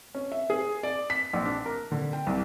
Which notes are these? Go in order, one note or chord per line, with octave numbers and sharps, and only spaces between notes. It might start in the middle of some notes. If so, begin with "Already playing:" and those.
C#4
E5
G#4
D5
B6
A#1
D4
A#4
D3
G5
C2